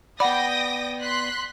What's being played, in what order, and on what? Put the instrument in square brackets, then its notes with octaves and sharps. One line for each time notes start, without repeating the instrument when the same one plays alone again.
[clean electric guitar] B3 D5 [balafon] F#5 B5 [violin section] G5 D#6 A#6
[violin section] C6 F#6 B6